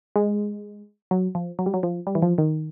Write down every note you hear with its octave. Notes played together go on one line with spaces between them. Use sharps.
G#3
F#3
F3
F#3
G3
F#3
F3
G3
E3
F3
D#3